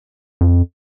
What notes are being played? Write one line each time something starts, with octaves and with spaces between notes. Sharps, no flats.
F2